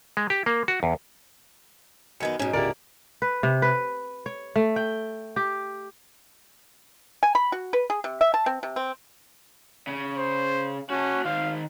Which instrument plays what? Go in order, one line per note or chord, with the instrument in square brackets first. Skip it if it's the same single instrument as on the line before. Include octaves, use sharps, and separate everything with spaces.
[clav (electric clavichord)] G#3
G4
A#3
F#4
E2
[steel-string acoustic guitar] F#2 D#3 B3 [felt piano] G#6 C#7
[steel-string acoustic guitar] G#2 B2 [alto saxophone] C#4
[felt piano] C#2 G4 [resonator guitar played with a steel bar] E4 A4 A#4 [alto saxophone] D5
[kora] B4
C3
B4
C#5
A3
G5
G4
[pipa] G#5
B5
F#4
B4
G#4
C3
E5
A5
C4
C3
C4
[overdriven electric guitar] C#3
[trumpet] C5
[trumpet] C#4 [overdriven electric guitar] F#4 A5
[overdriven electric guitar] D#3 C5 [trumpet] F5